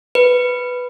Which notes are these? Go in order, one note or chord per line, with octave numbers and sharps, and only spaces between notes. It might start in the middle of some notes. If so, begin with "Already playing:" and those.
B4